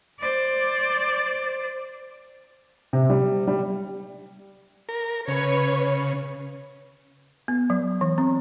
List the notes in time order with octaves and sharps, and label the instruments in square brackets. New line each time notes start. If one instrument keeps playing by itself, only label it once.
[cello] C5 D5
[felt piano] C3
G3
G3
[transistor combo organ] A#4
[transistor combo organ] C#3 [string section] B4 C#5
[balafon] B3
F#3
E3
C4